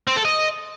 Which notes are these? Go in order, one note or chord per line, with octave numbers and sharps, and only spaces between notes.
C4
A4
D#5